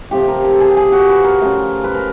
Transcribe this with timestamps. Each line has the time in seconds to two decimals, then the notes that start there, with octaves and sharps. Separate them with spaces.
0.11 C3 F3 A3 G4
0.28 A#4
0.45 A#4
0.53 A4
0.60 G#4
0.71 G4
0.77 G#4
0.92 F#4
1.09 B4
1.24 A#4
1.41 C#3 F3 A3
1.84 B4
1.95 A#4